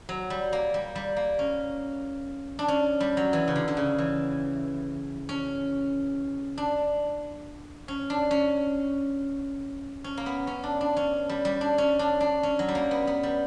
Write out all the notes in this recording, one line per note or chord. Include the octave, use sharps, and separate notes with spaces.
F#3
G3
A#3
G3
G3
A#3
C#4
D4
C#4
G3
F#3
E3
C#3
D3
D3
C#3
E3
C#4
D4
C#4
D4
C#4
C#4
A#3
B3
C#4
D4
D4
C#4
G3
G3
D4
C#4
D4
D4
C#4
F#3
G3
A#3
B3
B3
G3